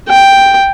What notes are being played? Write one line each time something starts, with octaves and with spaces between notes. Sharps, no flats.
G5